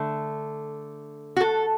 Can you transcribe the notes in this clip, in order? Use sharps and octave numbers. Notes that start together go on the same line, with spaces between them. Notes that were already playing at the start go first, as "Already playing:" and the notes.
Already playing: D3 A3
F#4
A4